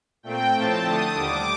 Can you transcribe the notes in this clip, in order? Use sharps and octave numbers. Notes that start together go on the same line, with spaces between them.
A#2 A3 C4 G5
A2 F3 A3 C4 A5
D3 A3 D4 D#6
D#2 D3 G3 D6